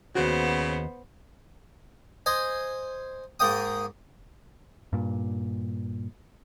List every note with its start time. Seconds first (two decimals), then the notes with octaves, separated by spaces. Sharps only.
0.15 D#2 C#3 B3 F#4 C5
2.26 C5 D#5 G#5
3.40 G#2 A#3 D#5 G5 D#6
4.93 G2 A#2